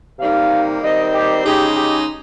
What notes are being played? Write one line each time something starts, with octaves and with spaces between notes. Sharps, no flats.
C3 G3 A#3 D#4 F5
D#3 G3 C4 D#4 D#5
G4
C#3 G#3 D#4 G4
G4